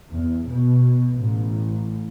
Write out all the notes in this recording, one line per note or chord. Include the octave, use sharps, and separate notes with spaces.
E2
B2
A1